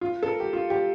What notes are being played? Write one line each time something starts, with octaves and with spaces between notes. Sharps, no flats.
F4
A4
A#4
G4
F4
G4